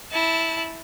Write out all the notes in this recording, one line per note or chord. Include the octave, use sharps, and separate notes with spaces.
E4 A5